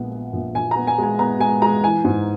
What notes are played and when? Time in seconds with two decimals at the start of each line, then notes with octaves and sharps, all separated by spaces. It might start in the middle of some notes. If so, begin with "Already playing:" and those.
Already playing: A#1 A#2 G#3 B3 F#5
0.12 B3
0.33 A#1
0.55 A#1 G#5
0.71 A#5
0.76 B3
0.87 G#5
0.98 G#3 G#5
1.19 B3 A#5
1.40 G#3 G#5
1.62 G#3 A#5
1.83 E3 G#5
2.05 G#2